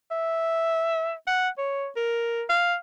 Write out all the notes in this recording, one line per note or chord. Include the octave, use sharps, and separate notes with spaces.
E5
F#5
C#5
A#4
F5